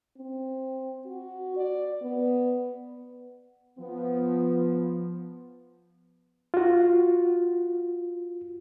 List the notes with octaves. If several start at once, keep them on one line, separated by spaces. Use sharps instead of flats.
C4
F#4
D5
B3
F3 B3
F4 F#4